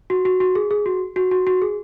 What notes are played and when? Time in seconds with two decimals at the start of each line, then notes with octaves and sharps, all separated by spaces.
0.10 F#4
0.25 F#4
0.40 F#4
0.55 G#4
0.71 G#4
0.86 F#4
1.16 F#4
1.31 F#4
1.47 F#4
1.62 G#4